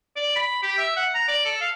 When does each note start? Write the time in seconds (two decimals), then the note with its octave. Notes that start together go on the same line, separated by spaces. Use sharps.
0.16 D5
0.36 B5
0.63 G4
0.78 E5
0.96 F#5
1.15 A#5
1.28 D5
1.45 A4
1.61 F5